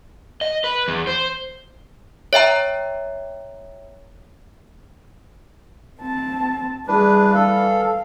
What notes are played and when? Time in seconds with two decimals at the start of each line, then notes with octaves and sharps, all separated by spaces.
0.41 D#5
0.64 B4
0.88 E2
1.07 C5
2.33 C#5 E5 G5 A#5
6.01 C4 A5
6.88 E3 G3 D4 G#4 B4
7.35 A4 F5